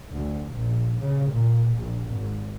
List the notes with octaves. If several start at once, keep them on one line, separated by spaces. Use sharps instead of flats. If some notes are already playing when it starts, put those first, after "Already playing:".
D2
A#1
C#3
A#2
A#1
G#1